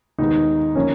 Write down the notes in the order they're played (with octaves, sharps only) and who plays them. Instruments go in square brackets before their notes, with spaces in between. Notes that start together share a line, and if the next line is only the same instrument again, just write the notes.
[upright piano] D#2 D#3 G#3 B3 [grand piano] D#4
[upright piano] D3 F3 A#3 [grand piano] C#4